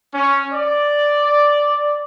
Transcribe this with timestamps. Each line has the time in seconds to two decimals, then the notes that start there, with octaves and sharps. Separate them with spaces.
0.14 C#4
0.52 D5